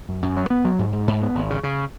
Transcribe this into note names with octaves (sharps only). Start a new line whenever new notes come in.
F#2
F#2
F#3
B3
F#3
G#2
G#2
G#2
B3
G#1
C#3
C#3